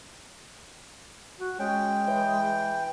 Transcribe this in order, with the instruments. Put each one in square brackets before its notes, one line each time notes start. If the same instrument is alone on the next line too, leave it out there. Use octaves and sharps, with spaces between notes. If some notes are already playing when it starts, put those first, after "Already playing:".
[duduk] F#4
[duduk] G#3 [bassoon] C#4 [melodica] G5
[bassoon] E3